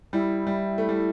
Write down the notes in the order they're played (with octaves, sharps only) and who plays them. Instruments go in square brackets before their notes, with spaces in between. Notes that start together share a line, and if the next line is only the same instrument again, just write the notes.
[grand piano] G3 [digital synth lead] E4
[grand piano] G3
A3
G3